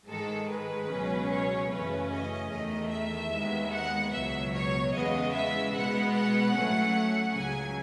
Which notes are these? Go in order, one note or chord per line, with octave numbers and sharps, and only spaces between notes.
G#2 D#3 G#3 A4
B4
C#2 B2 F#3 C#4
C#5
F#2 C#3 E3 A3 C#4 B4
D#5
E2 D#3 A3
E5
D#2 D#3 G#3 B3
F#5
C#2 B2 F#3 E5
C#5
E2 C#3 G#3 B3 D#5
E5
B2 G#3 B3 F#5
F#5
A2 F#3 A3 C#4
C#2 C#3 F#3 G#5